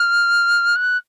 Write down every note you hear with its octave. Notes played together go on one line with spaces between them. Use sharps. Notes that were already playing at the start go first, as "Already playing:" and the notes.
Already playing: F6
F#6